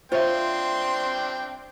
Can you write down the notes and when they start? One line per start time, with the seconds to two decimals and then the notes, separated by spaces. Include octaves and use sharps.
0.12 C4 D4 F4 C5 C#5 E5 G5 C6